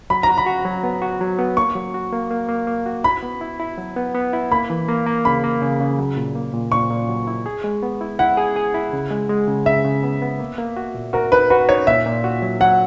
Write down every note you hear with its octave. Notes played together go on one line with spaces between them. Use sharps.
F#3 B5
A#5
F#4
B5
F#4
F#3
B3
F#4
F#3
B3
A#3 C#6
F#3
F#4
A#3
A#3
A#3
A#3
F#4
E4 B5
B3
E4
E4
F#3
B3
B3
E4
A#3 B5
E3
A#3
A#3
C#3 B5
A#3
C#3
C#3
F#3
A#2
A#3
A#2
A#2 C#6
A#2
F#3
E4
G#4
G#3
B3
E4
E4 F#5
G#4
G#4
E4
C#3
G#3
G#3
C#3
C#3 E5
C#3
B3
B3
A#3
A#3
F#4
A#2
F#4 A#4
D#4 B4
F#4 B4
D#4 C#5
A#2 E5
A#2
F#4
F#3
F#3 F#5